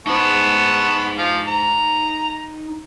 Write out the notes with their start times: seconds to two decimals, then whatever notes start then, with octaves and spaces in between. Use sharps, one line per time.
0.07 B3 D#4 C5 A5 C#6
1.18 F3 F5
1.47 A#5